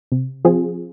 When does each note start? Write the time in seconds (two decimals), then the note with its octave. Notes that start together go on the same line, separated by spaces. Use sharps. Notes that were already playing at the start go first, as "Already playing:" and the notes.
0.12 C3
0.45 F3 C4 F4 G#4